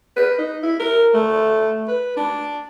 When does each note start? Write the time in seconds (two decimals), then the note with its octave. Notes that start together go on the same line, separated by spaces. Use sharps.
0.17 B4
0.39 D#4
0.63 E4
0.80 A#4
1.14 A3
1.88 B4
2.17 D4